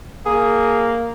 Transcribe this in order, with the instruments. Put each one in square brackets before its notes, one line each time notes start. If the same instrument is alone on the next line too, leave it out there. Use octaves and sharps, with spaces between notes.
[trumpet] A#3 [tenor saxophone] G#4